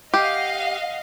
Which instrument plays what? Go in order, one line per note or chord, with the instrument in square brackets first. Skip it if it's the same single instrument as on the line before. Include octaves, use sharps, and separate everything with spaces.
[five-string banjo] G4 [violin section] D#5 F5 F#5